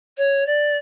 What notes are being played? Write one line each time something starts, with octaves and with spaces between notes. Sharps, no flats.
C#5
D5